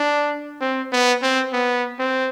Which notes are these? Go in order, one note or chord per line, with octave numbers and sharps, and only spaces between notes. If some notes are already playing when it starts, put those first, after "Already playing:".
Already playing: D4
C4
B3
C4
B3
C4